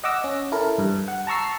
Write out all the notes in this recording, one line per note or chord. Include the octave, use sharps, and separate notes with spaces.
D#5 F#5 D6 E6 A#6
C#4
E4 A4 A#4
G2
F#5
A5 A#5 C#6 E6 C7